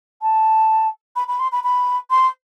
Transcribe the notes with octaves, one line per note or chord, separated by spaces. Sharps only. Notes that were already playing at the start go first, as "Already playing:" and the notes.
A5
B5
B5
C6
B5
B5
C6